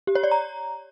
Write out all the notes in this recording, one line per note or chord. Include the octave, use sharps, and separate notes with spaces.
G4
C#5
D5
A#5